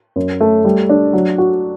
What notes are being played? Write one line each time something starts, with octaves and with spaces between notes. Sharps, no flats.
F#2
A3
G3
D4
F#3
F#4